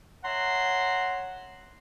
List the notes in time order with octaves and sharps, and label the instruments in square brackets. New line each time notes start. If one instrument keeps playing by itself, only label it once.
[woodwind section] C#5 E5 F#5 A#5 C6